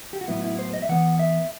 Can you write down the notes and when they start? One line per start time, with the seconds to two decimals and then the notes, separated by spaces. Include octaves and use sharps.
0.13 G4
0.21 F#4
0.28 A2 F#3 B3 E4
0.44 E4
0.59 C5
0.73 D#5
0.82 E5
0.89 E3 B3 F#5
1.19 E5